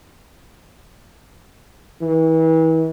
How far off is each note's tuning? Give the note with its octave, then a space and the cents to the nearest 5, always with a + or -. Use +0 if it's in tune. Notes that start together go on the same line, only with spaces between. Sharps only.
E3 -35